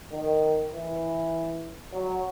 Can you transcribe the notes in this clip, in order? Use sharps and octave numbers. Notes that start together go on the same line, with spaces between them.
D#3
E3
F#3